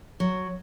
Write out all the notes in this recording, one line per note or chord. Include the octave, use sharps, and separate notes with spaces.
F#3